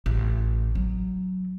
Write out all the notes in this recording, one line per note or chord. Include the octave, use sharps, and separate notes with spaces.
A1
F#3